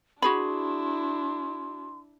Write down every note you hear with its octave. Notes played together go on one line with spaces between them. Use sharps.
D4 E4 F#4 G#4 B5 C6